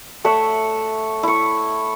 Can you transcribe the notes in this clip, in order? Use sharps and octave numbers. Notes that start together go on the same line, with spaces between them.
A3 C#5 E5 F#5
E4 C#6